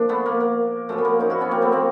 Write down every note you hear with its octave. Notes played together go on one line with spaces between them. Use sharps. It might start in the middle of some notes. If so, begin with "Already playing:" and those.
Already playing: A#2 F3 D4
A3 B3
A#3
A#3
F#2 C#3 F3 A3
B3
A#3
C#4 D#4
E4 F#4
B3 C#4
A#3 C4
A3 B3
A#3 C4